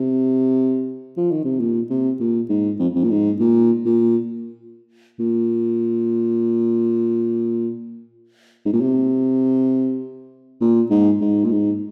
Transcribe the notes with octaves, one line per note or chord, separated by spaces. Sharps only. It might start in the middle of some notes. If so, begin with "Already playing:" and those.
Already playing: C3
F3
D#3
C3
A#2
C3
A#2
G#2
F2
F2
A#2
G#2
A#2
A#2
A#2
G#2
A#2
C3
A#2
G#2
G#2
A#2
G#2